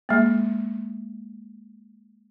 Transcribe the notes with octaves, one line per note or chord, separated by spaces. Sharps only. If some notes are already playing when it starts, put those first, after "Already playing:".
G#3 A#3